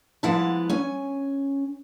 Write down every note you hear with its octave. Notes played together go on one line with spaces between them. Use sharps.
F3 G#3 B3 E4 F#5 A5
C#4 G#5